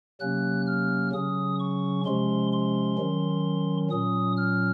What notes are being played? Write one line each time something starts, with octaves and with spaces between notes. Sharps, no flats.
C3 F#3 A#3 C#4 F#6
F6
C#3 F#3 C#4 D#6
C#6
C3 F3 G#3 C#4 C6
C6
D#3 F#3 C#4
A#2 F#3 C#4 D#6
F6